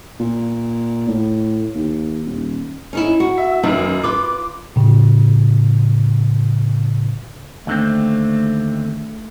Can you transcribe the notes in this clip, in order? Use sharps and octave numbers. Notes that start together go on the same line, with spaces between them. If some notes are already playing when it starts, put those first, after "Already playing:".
A#2
A2
D#2
D#1
C#4 D#4 E4
F#4
E5
F#2 D#3 A#3 D#4 B4
F4 B4 D6
A2 C#3
D#2 D3 A3 C4